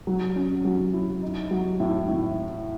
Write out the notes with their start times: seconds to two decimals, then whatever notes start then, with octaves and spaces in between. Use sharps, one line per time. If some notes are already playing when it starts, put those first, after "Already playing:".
0.07 F#3
0.36 C#4
0.65 F#3
0.93 E4
1.22 D#4
1.51 F#3
1.80 A2
2.08 A2